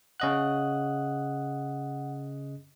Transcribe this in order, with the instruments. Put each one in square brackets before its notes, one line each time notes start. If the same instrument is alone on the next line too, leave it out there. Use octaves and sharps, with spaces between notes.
[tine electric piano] C#3 D#5 F#6 [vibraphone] F#5